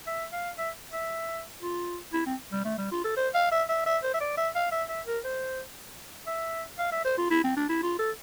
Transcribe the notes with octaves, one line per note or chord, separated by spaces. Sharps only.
E5
F5
E5
E5
F4
E4
C4
G3
A3
G3
F4
A4
C5
F5
E5
E5
E5
C5
E5
D5
E5
F5
E5
E5
A#4
C5
E5
F5
E5
C5
F4
E4
C4
D4
E4
F4
A4